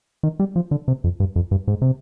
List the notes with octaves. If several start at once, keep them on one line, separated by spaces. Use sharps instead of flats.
D#3
G3
F3
D3
C3
F2
G2
F2
G2
G#2
C3